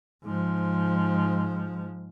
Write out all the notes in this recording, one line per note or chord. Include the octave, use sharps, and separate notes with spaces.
G#2 F3